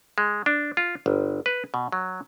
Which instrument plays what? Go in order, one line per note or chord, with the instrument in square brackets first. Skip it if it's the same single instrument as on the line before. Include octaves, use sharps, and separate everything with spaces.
[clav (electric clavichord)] G#3
D4
F4
G1
B4
B2
F#3